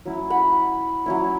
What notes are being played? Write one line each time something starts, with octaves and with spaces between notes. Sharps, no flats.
F#3 C#4 E4
F#5 B5
F#3 C#4 E4